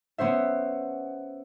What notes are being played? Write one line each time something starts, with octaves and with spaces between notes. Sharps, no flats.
B3 C#4 C5 E5